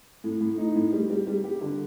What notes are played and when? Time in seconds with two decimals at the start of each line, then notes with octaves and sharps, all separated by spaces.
0.24 A2
0.41 A2
0.58 D#4
0.76 A2
0.93 G3
1.10 G3
1.27 G3
1.44 G4
1.61 D3